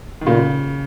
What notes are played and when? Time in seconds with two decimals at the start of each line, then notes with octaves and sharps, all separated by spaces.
0.21 D#3
0.27 A#2 C#3